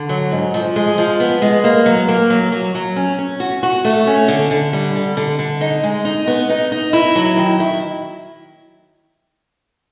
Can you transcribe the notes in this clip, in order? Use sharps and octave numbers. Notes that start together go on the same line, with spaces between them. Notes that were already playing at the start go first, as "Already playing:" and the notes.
Already playing: D3
F#3
G#2
F3
G#3
F3
B3
G#3
A#3
F#3
A#3
F#3
F#3
F#3
C#4
C#4
F#4
F#4
A3
C#4
D3
D3
G3
D3
D3
D3
D#4
G#3
D#4
B3
D#4
D#4
E4
F#3
D#3
E4